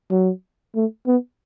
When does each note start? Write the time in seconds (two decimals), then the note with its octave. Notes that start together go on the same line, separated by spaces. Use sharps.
0.11 F#3
0.75 A3
1.07 B3